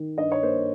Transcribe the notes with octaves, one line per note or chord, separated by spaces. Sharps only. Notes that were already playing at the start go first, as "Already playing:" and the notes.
Already playing: D#3
G2 D#5
C#5
A#3 C5